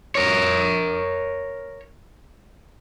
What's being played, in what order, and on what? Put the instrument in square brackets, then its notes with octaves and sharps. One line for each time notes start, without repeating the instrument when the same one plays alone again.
[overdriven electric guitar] A#4 C#5